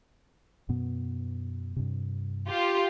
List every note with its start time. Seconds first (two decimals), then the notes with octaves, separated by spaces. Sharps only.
0.69 F#2 B2 B3
1.76 G2 C3
2.48 F4 G4